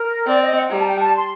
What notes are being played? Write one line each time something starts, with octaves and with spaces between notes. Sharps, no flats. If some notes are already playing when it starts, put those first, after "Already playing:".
Already playing: A#4
C4 D5
D#5
F#5
G3 A#5
A5
G5
A5
C6